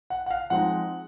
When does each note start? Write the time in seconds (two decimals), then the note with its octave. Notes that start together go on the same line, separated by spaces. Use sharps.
0.10 F#5
0.26 F#5
0.30 F5
0.50 F3 G#3 C4 D#4 F#5